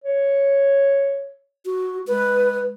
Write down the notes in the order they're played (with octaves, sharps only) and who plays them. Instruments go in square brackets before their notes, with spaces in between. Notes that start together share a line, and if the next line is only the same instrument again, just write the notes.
[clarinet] C#5
[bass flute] F#4
[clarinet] G#3 [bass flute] B4